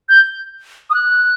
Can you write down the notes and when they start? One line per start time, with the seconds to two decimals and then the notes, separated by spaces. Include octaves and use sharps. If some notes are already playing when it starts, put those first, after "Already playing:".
0.09 G6
0.90 D#6
0.94 F#6